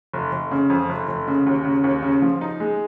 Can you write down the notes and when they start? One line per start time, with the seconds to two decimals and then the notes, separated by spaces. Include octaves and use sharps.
0.13 F1
0.32 F1
0.51 C#3
0.70 F2
0.89 F1
1.08 F1
1.28 C#3
1.46 D#2
1.65 C#3
1.84 D#2
2.02 C#3
2.22 F3
2.41 D#4
2.60 G#3